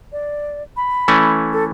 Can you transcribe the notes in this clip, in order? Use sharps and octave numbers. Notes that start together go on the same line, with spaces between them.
D5
B5
E3 A3 C#4
A4